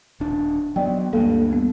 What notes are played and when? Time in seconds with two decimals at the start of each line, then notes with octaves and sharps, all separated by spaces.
0.20 D#1 D4
0.76 F#3 B3 D5 D#5 G5
1.13 D2 G2 A#3 A4 F5
1.51 G3 B3